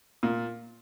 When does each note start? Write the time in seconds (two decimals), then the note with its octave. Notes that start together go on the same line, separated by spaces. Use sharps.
0.23 A#2